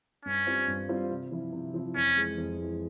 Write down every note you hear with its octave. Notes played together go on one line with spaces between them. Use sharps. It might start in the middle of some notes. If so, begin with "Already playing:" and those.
G2 C#4
G3 C4 F4 C5
G2
G3 C4 F4 C5
C3
F3 C4 E4
C3
F3 C4 E4
F2 C#4
E3 G#3
F2
E3 G#3